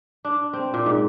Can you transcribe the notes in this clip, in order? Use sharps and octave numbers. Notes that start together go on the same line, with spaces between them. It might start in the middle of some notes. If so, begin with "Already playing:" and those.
D4
C4
A#2
G#2